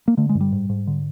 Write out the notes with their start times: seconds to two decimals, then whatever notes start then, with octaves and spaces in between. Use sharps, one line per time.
0.08 A#3
0.17 D3 A3
0.29 G#3
0.35 G2
0.41 G3
0.52 G#2
0.69 G#2
0.87 D3